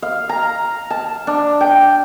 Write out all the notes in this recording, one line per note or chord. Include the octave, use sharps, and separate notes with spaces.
F5
A#5
A5
D4
G5